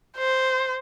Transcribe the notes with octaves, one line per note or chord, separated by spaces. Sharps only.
C5